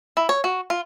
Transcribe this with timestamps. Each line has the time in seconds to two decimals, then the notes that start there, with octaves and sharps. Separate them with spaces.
0.17 E4
0.29 C#5
0.44 F#4
0.70 F4